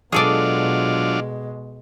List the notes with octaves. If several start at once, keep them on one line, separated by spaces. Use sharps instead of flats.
B2 F#3 G#3 D4 F4 G#4 A4 D5